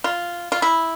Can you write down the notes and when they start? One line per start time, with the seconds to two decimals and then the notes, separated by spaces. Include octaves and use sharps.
0.04 F4
0.52 F4
0.62 E4